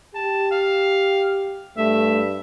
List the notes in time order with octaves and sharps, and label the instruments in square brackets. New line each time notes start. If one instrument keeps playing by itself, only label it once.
[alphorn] G4 [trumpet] A5
[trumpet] F5
[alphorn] G2 [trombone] A3 [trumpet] E5